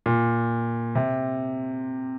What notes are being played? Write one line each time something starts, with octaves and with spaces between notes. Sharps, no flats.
A#2
C3